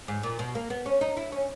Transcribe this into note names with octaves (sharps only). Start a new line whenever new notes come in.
G#2
A#2
B2
A#3
B3
C#4
D#4
E4
C#4